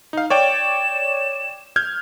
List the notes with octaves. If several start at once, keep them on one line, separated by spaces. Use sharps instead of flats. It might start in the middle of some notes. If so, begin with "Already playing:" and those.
D#4 F5
C#5 D5 G5 E7
F6 G6 G#6